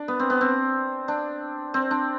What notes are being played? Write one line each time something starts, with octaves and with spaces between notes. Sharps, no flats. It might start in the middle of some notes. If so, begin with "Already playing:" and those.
Already playing: D4
B3
C4
B3
C4
D4
C4
D4